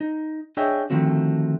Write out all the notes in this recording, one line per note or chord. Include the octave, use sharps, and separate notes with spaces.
D#4
D4 G#4 C#5 D#5 E5 G5
D3 D#3 F3 A3 C4 F#4